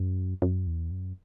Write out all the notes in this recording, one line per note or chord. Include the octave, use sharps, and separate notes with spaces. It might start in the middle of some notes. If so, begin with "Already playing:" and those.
Already playing: F#2
F#2
E2
F#2